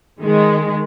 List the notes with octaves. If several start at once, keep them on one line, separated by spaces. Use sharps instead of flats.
D#3 G#3